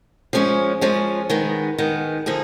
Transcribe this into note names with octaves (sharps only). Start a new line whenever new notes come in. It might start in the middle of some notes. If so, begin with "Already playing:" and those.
F3 G#3 C#4
F3 G#3 C#4
D#3 G#3 B3
D#3 G#3 B3
D3 F3 A#3 D#4 G#4